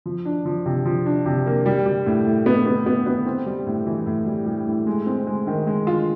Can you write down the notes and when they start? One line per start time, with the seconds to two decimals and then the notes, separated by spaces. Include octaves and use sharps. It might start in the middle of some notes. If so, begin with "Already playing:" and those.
0.06 F3
0.25 D4
0.46 F3
0.66 C3
0.85 F3
1.06 D4
1.26 C3
1.46 A#3
1.66 G3
1.86 G3
2.06 A2
2.26 A2
2.46 B3
2.66 B3
2.86 B3
3.06 B3
3.26 C4
3.46 G3
3.66 A2
3.87 E3
4.06 A2
4.26 G3
4.46 G3
4.67 A2
4.87 G#3
5.06 C4
5.27 G#3
5.47 D#3
5.67 G#3
5.87 F4